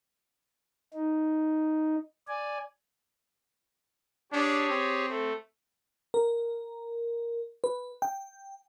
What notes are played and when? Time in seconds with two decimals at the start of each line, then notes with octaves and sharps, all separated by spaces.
0.94 D#4
2.28 D5 G#5
4.32 D4 G4 G#4 C#5
4.69 C4
5.09 A3
6.14 A#4
7.64 B4
8.02 G5